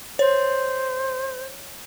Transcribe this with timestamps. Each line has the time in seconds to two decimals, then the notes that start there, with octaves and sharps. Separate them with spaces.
0.19 C5 C#5